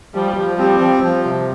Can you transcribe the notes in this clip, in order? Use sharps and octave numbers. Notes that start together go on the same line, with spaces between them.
F3 G3
F3
G3 C4
F3
F3
C3